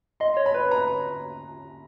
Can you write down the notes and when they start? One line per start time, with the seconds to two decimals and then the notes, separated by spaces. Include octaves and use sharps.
0.20 D#5 C6
0.37 C#5
0.46 B5
0.54 B4
0.71 A#5